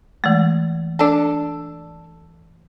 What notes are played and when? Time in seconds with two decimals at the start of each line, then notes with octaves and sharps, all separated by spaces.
0.24 E3 G#3 A3
0.99 D4 A4